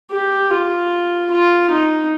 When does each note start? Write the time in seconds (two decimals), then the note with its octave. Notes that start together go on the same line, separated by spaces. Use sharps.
0.11 G4
0.51 F4
1.30 F4
1.70 D#4